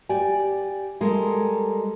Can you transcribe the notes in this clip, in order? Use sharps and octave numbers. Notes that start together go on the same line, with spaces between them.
G4 D5 G#5
G3 G#3 A4 A#4